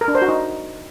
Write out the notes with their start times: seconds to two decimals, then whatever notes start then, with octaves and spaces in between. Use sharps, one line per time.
0.01 A#4
0.08 D4
0.15 C5
0.22 F#4
0.28 D#4